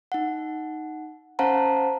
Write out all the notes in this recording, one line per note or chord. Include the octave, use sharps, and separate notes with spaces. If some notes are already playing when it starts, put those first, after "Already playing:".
D#4 F#5
C#4 C5 F5 F#5 A5 A#5